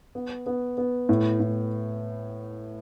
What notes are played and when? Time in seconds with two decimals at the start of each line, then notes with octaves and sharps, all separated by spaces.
0.15 B3
0.46 B3
0.78 B3
1.09 A2
1.40 A2